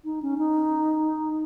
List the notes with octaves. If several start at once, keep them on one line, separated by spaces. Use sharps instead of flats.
D#4
C#4
D#4